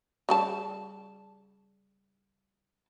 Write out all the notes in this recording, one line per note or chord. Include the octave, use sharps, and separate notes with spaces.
C#3 G3 A5